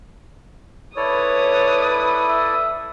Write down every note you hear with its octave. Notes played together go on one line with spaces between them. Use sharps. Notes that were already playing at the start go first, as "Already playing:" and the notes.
E4 A4 B4 C#5 D5 D#6
E5